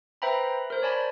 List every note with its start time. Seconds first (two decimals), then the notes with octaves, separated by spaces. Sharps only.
0.22 B4 C5 E5 G5 A#5 B5
0.70 A#4 C5
0.82 C#5 D5 G#5 A5 B5